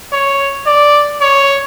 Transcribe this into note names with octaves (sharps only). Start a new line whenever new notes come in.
C#5
D5
C#5